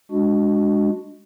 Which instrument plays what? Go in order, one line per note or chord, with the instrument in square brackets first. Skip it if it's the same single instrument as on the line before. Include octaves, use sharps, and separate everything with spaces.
[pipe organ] G#3 D4 F#4